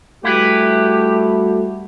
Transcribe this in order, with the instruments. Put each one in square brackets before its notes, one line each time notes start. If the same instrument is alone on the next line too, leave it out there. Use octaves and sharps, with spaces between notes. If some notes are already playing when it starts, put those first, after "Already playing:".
[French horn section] G3 F#4 [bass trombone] A3 [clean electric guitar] E4 B4 [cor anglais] G4